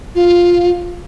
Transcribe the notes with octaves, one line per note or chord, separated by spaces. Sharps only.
F4